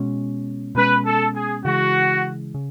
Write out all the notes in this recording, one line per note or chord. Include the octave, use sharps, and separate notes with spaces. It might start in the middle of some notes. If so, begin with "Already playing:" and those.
Already playing: B2 G#3 C#4
B2 G#3 C#4 B4
A4
G#4
C#3 E3 G#3 F#4
C#3